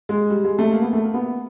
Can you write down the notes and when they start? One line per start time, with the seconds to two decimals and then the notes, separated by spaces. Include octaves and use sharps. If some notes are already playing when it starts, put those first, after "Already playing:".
0.09 G#3
0.30 G3
0.45 G#3
0.59 A3
0.72 A#3
0.82 B3
0.93 A3
1.04 A#3
1.14 B3